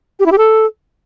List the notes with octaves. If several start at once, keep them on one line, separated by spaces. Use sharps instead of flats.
G4
E4
G4
A4